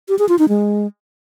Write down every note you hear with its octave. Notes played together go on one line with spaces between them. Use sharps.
G4
G#4
F4
D#4
G#3